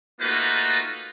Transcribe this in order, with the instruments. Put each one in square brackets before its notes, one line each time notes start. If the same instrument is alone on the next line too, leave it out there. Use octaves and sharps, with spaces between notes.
[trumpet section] A3 A#3 D#4 F4 F#4 B4